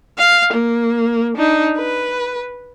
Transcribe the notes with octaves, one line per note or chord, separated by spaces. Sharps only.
F5
A#3
D4 D#4
B4